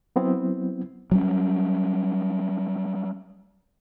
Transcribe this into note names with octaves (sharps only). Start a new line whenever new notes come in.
F#3 B3 C4 E4
F#3 G3 C#4